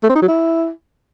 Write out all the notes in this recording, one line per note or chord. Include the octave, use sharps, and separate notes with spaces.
A3
C4
D#4
F#3
E4